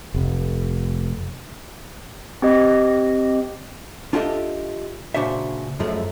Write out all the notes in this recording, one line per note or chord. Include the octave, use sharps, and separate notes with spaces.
F1
C4 G4 D#5
D4 F4 G4 A4 D#5 E5
A#2 C#3 D4 F#4 C5 E5
F#2 F3 G#3 A3